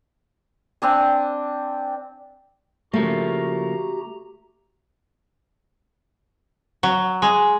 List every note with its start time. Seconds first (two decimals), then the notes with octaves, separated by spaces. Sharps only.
0.82 C4 D4 G#5
2.93 C#3 F3 A3 A#3 F#4 G4 A#5
6.83 F#3
7.22 G#3